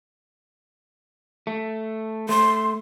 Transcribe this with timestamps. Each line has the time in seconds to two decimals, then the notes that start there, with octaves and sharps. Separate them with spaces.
1.47 A3
2.29 A3 C6